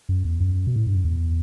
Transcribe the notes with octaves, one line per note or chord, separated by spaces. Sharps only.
F#2
E2
F#2
B2
A2
G2
F#2
E2